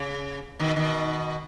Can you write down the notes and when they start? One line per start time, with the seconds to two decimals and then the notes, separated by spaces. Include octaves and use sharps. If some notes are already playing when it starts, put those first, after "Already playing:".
Already playing: C#3
0.59 B2 D#3
0.76 B2 D#3